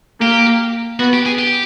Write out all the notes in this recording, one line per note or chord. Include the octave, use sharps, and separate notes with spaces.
A#3 G4
B3 F#4
G4
G#4
G4